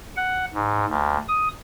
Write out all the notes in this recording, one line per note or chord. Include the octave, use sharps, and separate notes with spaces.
F#5
G#2
D2
D#6